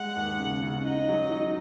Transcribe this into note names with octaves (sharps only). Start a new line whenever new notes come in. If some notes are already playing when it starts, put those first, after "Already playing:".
Already playing: G#3 F#5
D#2
C#3
C#3
D#4 D#5
F#3
D#4